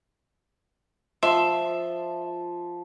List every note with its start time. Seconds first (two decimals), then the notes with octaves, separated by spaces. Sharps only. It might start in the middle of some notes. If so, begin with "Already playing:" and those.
1.23 F3 E5 C6